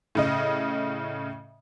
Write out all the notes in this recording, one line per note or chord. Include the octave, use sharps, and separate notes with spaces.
A2 C#3 D#5